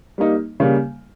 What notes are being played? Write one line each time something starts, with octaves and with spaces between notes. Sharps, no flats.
G3 A#3 D#4
C#3 G3 A#3